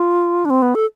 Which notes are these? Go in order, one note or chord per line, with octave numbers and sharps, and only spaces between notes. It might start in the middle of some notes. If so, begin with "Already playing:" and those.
Already playing: F4
D4
C4
B3
A4